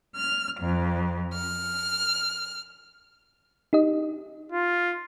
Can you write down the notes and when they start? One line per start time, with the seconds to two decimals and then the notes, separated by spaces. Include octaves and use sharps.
0.17 F6
0.60 F2
1.34 F6
3.73 D#4 G4 D#5
4.52 F4